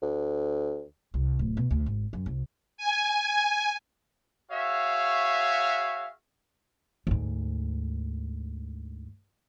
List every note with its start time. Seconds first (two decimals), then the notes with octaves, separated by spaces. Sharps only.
0.02 D2
1.14 C2
1.39 D1
1.57 B2
1.71 D2
1.86 G#1
2.13 F#2
2.26 C2
2.78 G#5
4.52 F#4 G#4 C#5 E5 F5
7.07 D2 G#2